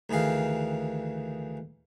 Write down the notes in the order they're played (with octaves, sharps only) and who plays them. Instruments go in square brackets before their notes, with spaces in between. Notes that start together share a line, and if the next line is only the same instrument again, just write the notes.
[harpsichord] D2 D#3 E3 G#4 F5